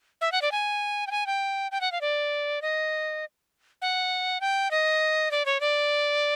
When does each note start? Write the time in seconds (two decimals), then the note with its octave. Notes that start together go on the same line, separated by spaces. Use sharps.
0.21 E5
0.32 F#5
0.42 D5
0.52 G#5
1.07 G5
1.11 G#5
1.27 G5
1.72 G5
1.81 F#5
1.92 F5
2.01 D5
2.62 D#5
3.82 F#5
4.41 G5
4.71 D#5
5.31 D5
5.46 C#5
5.61 D5